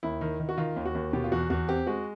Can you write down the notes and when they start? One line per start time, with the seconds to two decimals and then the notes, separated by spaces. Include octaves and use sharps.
0.03 D#2 E4
0.21 D#3
0.40 D#3
0.49 F#4
0.57 D#3 F4
0.76 D#2
0.85 F#4
0.95 D#2
1.13 B2 G4
1.24 F4
1.32 E2 F#4
1.50 E2 F#4
1.69 C4 G4
1.87 G#3 F#4